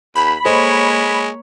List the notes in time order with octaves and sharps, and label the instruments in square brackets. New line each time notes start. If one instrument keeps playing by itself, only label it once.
[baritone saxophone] D#2 [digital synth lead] B5
[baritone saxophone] G#3 [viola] A#3 C#5 [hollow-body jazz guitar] A4 C5 D#5